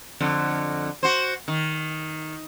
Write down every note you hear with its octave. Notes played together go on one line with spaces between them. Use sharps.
F2 D3
F#4 C5
D#3